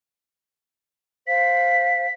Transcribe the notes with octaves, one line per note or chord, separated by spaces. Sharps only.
C5 F5 B6